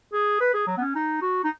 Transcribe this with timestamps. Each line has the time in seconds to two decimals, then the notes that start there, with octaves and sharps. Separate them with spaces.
0.13 G#4
0.41 B4
0.54 G#4
0.67 F#3
0.77 B3
0.81 C#4
0.95 D#4
1.22 F#4
1.44 D#4